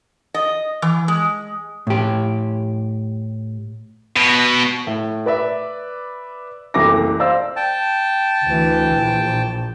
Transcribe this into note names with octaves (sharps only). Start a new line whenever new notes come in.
D#5
E3
G#3
A2 G4
B2
A2
B4 D5 E5
F#1 C2 E3 A3 D6 A#6
C5 D5 F5 E6
G5 A5
D2 E3
A#1